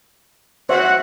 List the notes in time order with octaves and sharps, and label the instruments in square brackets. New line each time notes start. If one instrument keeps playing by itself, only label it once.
[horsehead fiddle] F#4 F#5 [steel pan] C5 C#5 E5